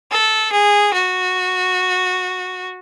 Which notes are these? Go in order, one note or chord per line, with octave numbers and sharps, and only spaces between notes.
A4
G#4
F#4